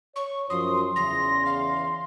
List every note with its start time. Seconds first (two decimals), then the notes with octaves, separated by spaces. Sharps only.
0.16 C#5 C#6
0.50 F#2 F3 C6 D#6
0.96 E2 C#3 E3 A#6
1.46 F5